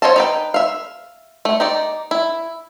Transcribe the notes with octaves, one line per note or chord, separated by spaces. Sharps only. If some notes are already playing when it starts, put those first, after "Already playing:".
C5 C#5 D#5 F5 A5
D#4 B4 G5
E5 F5
A3
D#4 G4 D5
E4